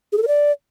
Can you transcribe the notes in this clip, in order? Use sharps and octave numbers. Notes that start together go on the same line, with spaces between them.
G#4
A4
A#4
D5